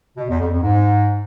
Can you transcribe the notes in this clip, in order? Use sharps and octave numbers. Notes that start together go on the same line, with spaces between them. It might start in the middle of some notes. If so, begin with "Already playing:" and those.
B2
E2
F2
F2
G#2